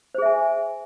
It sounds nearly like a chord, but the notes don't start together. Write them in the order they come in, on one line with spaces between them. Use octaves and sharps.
C5 G#4 E5 G#5